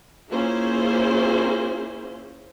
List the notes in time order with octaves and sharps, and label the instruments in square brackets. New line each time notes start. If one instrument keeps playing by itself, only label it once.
[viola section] A#3 C#4 E4 F4 G#4 C5